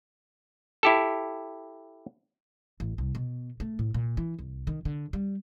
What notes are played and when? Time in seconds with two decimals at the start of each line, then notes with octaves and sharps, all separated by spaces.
0.83 E4 G4 A4
2.80 A1
2.98 C2
3.15 B2
3.60 A3
3.79 A2
3.94 A#2
4.17 E3
4.39 C2
4.67 D#3
4.85 D3
5.13 G3